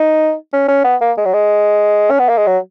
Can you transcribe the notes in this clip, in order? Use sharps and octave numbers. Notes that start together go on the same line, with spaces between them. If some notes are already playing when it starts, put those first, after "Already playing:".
Already playing: D#4
C#4
C#4
B3
A#3
G#3
F#3
G#3
C#4
B3
A#3
G#3
F#3